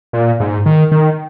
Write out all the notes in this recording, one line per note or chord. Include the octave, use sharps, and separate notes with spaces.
A#2
G#2
D#3
D#3